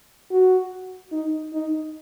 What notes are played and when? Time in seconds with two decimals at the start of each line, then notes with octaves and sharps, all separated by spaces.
0.31 F#4
1.12 D#4
1.53 D#4